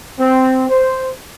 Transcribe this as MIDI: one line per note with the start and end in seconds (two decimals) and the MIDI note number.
0.20 0.65 60
0.70 1.10 72